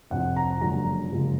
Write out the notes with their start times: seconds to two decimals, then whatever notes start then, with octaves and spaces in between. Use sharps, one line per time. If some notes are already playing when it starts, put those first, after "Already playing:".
0.11 F1 F2 F3 F#5
0.36 A#5
0.61 F#1 F#2 D3 F3 G#3 A#5
1.12 F#1 F#2 F3 G#3